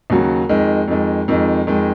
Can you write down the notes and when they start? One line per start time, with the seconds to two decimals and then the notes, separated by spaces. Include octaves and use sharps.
0.10 D#2 C#3 F#3
0.49 F2 D#3 G#3
0.88 F2 D#3 G#3
1.28 F2 D#3 G#3
1.67 F2 D#3 G#3